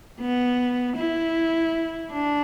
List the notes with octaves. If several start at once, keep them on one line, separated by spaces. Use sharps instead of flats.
B3
E4
D4